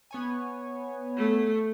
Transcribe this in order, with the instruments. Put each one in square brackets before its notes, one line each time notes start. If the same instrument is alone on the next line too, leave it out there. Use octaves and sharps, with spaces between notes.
[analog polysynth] B3 C#5 G#5
[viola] A3